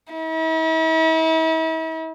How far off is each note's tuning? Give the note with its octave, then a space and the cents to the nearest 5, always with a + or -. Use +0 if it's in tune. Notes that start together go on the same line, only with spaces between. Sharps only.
E4 -45